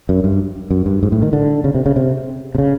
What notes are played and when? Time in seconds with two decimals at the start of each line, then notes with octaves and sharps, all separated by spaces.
0.09 F#2
0.24 G2
0.71 F#2
0.86 G2
1.03 G#2
1.12 A2
1.22 D#3
1.33 D3
1.64 C#3
1.75 C3
1.86 C#3
1.96 C3
2.55 C3
2.58 C#3